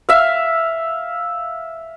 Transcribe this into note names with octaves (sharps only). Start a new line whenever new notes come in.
E5 F5